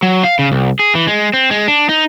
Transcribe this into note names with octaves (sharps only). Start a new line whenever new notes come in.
F#3
F5
C#3
C2
G#4
E3
G#3
C4
G#3
D4
D#4